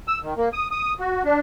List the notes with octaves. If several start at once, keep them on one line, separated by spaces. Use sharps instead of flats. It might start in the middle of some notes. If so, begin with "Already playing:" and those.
E6
D#3
A#3
D#6
D#6
F#4
D4